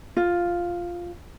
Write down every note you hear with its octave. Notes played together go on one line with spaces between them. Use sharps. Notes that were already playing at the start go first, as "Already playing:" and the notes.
F4